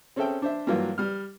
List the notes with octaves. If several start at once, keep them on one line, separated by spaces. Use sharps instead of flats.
C4 C#4 G#4 A4 E5 G5
D4 C5 E5
G2 E3 F#3 A#3 F4
G3 F6